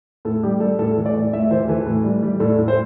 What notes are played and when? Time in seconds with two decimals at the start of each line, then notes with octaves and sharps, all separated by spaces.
0.25 A2 A4
0.43 G3 G4
0.60 G3 A4
0.79 A2 A4
0.97 E3
1.06 D5
1.15 A2
1.33 A2 E5
1.51 E3 C5
1.68 E3 A4
1.86 A2
2.04 G3
2.23 G3
2.40 A2 A4
2.58 A2
2.68 C5